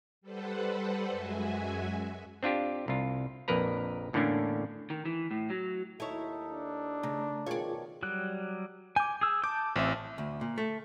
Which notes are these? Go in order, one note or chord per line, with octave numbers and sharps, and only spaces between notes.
G3 A4 B4 C5 F#5
F#2 G#3 F#4 E5 G#5
C4 D4 F4 G4
C2 F4
A#1 F2 A#4 B4 A#5
E2 A2 D3 A#3 C#4 D4
D#3
E3
A2
F#3
D#2 D#4 E4 A4 C#5
D4
C#3 A3 A#5
B2 D#3 F3 F4 G#4 A#4 C#5 D5
F#3 G3 F#6
G#5 D6 G6
G#4 E6
A5 D6 G6
A1 C4 E5 D6
D2
A#2
A3